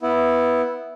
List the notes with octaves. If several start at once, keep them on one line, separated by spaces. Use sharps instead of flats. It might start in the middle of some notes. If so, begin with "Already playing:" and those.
B3 E4